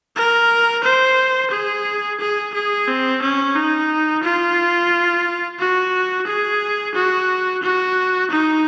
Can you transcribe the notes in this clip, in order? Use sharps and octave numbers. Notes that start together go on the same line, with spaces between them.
A#4
C5
G#4
G#4
G#4
C4
C#4
D#4
F4
F#4
G#4
F#4
F#4
D#4